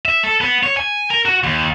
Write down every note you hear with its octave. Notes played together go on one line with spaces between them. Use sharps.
E5
A4
B3
C#5
G#5
A#4
F#4
D#2